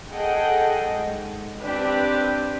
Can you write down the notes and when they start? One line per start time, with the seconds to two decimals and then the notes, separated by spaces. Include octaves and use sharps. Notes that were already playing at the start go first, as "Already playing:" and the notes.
0.12 G#4 A4 D#5 F#5 G5
0.93 G#2
1.61 C4 D4 G4 B4